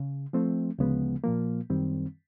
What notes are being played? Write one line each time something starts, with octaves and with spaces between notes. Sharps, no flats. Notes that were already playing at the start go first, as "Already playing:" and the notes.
Already playing: C#3
F3 A3 C4
D2 C#3 F3 G#3 B3
A#2 F3 A#3
F#2 D#3 G3 C4